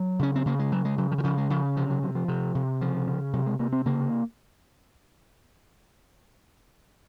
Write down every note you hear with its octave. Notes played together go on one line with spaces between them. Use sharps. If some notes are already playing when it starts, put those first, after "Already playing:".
Already playing: F#3
C#3 C#4
C4
C#3 A#3
G#3
C#3 F#3
G#3
C#3 F#3
F3
D#3
C#3 F3
G#3
C#3 F3
C3 F3
F#3
C3 F#3
F3
C3
C3
C#3 F3
C#3
C3 F#3
G#3
C3 A#3
C4
C#3 A#3